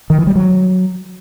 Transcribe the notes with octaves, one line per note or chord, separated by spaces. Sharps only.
D#3
E3
G3
F#3